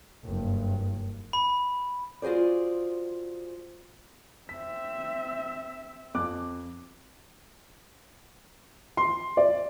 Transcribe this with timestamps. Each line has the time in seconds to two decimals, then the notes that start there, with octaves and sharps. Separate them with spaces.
0.25 F#1 G2
1.33 B5
2.22 F4 F#4 G#4 C5 D5
4.49 C4 E5 B6
6.14 F2 D6 F#6
8.97 C6
9.37 D5